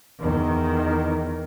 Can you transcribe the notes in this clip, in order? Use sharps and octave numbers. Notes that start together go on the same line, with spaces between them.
E2 D#3